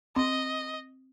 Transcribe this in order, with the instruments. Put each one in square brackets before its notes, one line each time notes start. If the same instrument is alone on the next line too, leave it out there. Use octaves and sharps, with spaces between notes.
[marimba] C4 [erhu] D#5